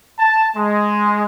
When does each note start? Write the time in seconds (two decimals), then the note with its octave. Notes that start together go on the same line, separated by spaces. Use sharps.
0.19 A5
0.56 G#3